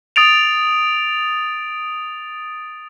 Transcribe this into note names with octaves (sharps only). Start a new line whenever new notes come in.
D#6 A6 D7 F7